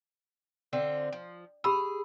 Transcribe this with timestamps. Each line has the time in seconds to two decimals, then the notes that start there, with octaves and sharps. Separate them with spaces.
0.73 D3 C4 F4
1.12 F3
1.64 G4 G#4 B5 E6